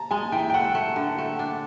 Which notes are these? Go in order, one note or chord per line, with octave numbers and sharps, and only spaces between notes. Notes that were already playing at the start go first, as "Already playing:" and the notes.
Already playing: A5 A#5
G#3 G#5
E3 G5
G5
A3 F#5
A3
D3
A3
D4